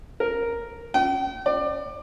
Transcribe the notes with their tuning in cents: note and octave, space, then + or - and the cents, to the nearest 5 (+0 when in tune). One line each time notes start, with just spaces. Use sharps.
A#4 +0
G5 -40
D5 +25